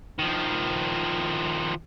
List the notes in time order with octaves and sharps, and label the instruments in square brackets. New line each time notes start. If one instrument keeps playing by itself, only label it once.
[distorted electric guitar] D#3 F3